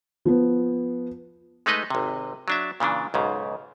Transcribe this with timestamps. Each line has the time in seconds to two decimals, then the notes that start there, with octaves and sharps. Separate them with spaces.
0.25 F3 B3
1.66 G#3 A3 D#4 B4 D#5
1.90 G#1 C3
2.48 F#3 D4 E5
2.80 A#2 C#3 E3 D4
3.14 B1 G#2 C#3